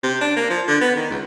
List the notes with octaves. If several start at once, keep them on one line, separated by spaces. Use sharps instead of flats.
C3
D4
A#3
F3
D3
B3
D#3
C#2